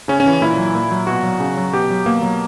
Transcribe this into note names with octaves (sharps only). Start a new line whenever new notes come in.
C#3 C#4
C#4
E3
A#2 E4
F#3
A#2
F#3
B2 F#4
F#3
C#3
F#3
B2 G4
F#3
B2 A#3
F#3